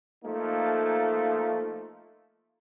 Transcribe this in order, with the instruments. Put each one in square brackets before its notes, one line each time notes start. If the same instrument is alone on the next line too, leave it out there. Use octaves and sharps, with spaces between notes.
[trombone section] F3 A3 A#3 D#4